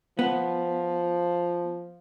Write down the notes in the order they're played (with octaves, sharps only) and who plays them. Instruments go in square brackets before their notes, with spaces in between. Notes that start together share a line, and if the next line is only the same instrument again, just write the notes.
[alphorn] F3 [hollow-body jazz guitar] B3